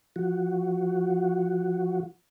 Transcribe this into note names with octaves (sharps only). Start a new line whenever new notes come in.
F3 F#4